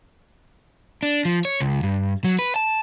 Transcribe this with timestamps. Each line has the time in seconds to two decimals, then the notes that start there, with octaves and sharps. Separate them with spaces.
1.03 D4
1.25 F3
1.45 C#5
1.60 C#2
1.83 G2
2.24 F#3
2.39 B4
2.56 A5